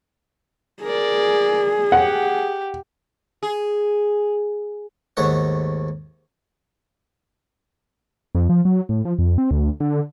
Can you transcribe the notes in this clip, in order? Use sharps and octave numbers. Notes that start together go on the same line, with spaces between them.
G#4 A#4 D5
G4 F#5
G#4
D#2 G#2 A3 C#5 F#5
F2
F3
F#3
A2
F3
F2
C4
D2
D3